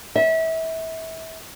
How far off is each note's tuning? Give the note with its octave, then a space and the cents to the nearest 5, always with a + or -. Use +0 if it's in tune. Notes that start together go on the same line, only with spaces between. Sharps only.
E5 -30